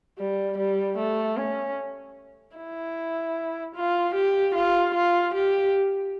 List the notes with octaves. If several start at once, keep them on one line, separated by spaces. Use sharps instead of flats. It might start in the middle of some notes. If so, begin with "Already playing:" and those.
G3
G3
A3
C#4
E4
F4
G4
F4
F4
G4